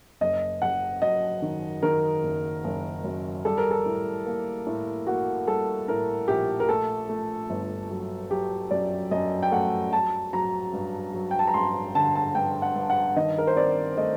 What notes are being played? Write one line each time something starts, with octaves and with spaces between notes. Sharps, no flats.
F#1 D#5
F#1 F#5
F#2 D#5
D#3
D#3 A#4
F#1
F#1
F#2
G3 A4
A#4
A4
A2
A#3
A2
A#3 F#4
G3 A4
A2 A#4
A#1 G4
A#4
A3 A4
A3
G1
F#3
F#3 G4
F#2 D5
F#2 D#5
G5
A3 F#5
F#3 A5
F#3 A#5
G2
F#3
G5
A5
A#5
G2 C6
D3 A5
A5
G2 G5
F#5
G2
F#5
D#3 D#5
A#4
C5
C4 D5
A3 D#5